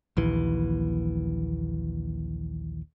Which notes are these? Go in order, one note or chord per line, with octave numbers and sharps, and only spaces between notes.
A#1 D#2 E3